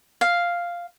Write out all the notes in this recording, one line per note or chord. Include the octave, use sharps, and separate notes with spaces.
F5